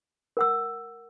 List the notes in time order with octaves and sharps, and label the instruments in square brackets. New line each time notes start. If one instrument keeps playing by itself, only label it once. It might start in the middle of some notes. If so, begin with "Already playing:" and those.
[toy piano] A#4 F#5 E6